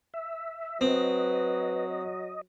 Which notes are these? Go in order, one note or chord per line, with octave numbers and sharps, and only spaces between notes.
E5
F#3 C4 B4 D#5